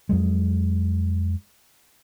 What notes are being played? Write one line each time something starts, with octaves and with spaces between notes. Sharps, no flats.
F2 F#3 G#3